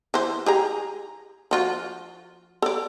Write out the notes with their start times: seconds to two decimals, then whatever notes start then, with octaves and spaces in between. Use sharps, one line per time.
0.14 E3 C5
0.46 G4 G#4 A#5
1.51 F3 F4 F#4
2.62 A4 D5